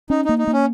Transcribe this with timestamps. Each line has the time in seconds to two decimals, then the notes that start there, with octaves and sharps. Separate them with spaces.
0.10 C#4 D#4
0.25 A#3 D#4
0.38 D#4
0.47 A#3
0.53 C#4